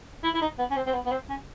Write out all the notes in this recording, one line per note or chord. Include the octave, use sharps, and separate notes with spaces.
E4
E4
D#4
B3
C#4
C4
C4
B3
B3
C4
C#4